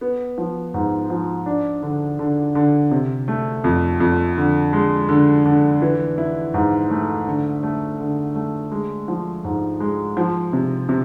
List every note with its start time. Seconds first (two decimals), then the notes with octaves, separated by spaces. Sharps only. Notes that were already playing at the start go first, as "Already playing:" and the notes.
0.01 B3
0.38 F3
0.74 G#2
1.10 F3
1.46 D4
1.83 D3
2.19 D3
2.55 D3
2.91 C3
3.28 A3
3.64 F2
4.00 F2
4.37 D3
4.73 G#3
5.09 D3
5.45 D3
5.82 E3
6.18 E4
6.54 G#2
6.90 A3
7.27 D3
7.63 A3
8.00 D3
8.35 A3
8.72 G#3
9.08 F3
9.44 G#2
9.80 G#3
10.17 F3
10.53 C3
10.89 C3